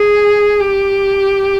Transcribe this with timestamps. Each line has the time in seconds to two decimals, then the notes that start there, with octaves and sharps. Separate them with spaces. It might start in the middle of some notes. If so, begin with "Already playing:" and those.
Already playing: G#4
0.60 G4